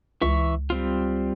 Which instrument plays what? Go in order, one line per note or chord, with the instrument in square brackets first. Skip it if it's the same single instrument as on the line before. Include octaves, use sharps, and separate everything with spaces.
[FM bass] C#2 [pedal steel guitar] E3 E5 C#6
[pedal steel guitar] G3 C4 F4